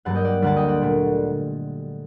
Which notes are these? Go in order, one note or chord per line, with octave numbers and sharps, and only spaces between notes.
G2 F#3 A#3 F#5 A5
D#5 G5
D5 F#5
D2 D3 G3 A#3 F#5 A5
D#5 G5
D5 F#5
A#2 A3